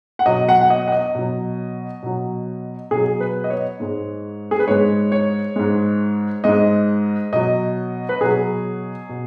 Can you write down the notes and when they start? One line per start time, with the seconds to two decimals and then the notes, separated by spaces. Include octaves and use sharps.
0.19 F#5
0.26 B2 F#3 D#5
0.49 F#5
0.61 F#5
0.70 D#5
0.88 F#5
0.92 D#5
1.15 B2 F#3
2.03 B2 F#3
2.91 B2 F#3 G#4
3.20 B4
3.44 D#5
3.50 C#5
3.80 G#2 G#3
4.51 G#4
4.59 B4
4.67 G#2 G#3 C#5
5.12 C#5
5.56 G#2 G#3
6.44 G#2 G#3 D#5
7.32 B2 F#3 D#5
8.09 B4
8.21 B2 F#3 G#4
9.09 B2